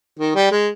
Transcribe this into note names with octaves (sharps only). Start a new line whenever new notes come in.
D#3
G3
G#3